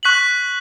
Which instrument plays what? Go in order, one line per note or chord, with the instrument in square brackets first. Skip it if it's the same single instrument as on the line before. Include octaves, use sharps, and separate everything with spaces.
[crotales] C#6 F#6 B6 F#7